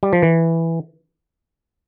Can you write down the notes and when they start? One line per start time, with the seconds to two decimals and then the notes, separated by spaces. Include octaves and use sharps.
0.03 G3
0.13 F3
0.23 E3